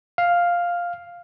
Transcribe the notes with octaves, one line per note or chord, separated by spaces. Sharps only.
F5